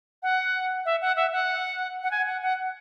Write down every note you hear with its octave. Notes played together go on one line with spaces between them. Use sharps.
F#5
E5
F#5
E5
F#5
F#5
G#5
F#5
F#5